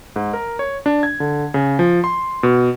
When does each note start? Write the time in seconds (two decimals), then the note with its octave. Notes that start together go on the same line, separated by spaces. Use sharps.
0.16 G#2
0.33 A#4
0.59 C#5
0.86 D4
1.03 G#6
1.20 D3
1.54 C#3
1.79 F3
2.04 C6
2.43 B2